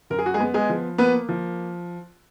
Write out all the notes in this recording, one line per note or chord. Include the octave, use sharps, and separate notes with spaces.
F#2 A#4
G#4
F#4
G#3 G#4
B3
G#3 G#4
F3
A#3 B3 B4
F3